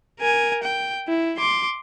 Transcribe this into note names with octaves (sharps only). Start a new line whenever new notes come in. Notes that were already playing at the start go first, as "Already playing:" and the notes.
A#4 G#5
G5
E4
C6 D6